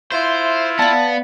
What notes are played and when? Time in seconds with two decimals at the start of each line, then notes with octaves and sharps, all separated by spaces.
0.12 E4 F4 C5 E5
0.79 B3 D5 F5 A5